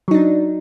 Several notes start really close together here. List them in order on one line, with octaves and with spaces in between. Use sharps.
F#3 D#4 D4